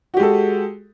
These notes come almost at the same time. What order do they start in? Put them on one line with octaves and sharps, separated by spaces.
F#4 G4 G#3 A4